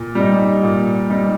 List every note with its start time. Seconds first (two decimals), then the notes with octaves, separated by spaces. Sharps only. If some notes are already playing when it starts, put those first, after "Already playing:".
Already playing: A#2
0.15 G3 D#4
0.63 A#2
1.10 G3 D#4